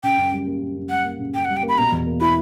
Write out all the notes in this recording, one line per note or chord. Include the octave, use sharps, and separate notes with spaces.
C#3 G5
F#2
G3
A#3
C#3
F#2
G3 F#5
A#3
C#3
F#2 G5
G3 F#5
G5
A#3
B5
B2 A#5
E2
A#3
E4 B5